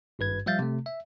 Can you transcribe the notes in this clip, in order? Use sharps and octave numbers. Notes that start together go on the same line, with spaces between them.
G#1 G2 B4 G#6
F3 G3 E5 F5 G6 A6
C3 A3
E5